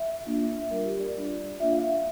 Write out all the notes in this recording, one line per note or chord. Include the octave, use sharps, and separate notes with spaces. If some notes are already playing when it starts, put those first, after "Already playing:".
Already playing: E5
A#3 D4 F4
G3 D4 F4 A#4
G4
D5
G3 D4 F4
A#3 D4 F4 E5
F5
F5